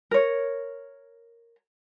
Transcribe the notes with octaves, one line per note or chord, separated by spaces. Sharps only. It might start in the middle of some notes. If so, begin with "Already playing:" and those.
A#4 C#5